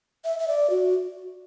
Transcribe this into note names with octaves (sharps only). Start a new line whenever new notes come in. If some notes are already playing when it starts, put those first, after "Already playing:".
E5
E5
D5
F#4